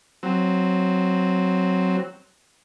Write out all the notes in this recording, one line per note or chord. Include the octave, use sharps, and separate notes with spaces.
F#3 C4